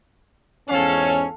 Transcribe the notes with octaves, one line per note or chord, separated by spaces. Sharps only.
E2 G#2 C#4 A4 F5